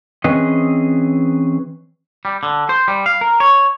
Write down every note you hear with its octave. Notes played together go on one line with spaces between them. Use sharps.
E3 C4 C#4 G#4 B4 D#5
G3
D3
C5
G3
F5
A#4
C#5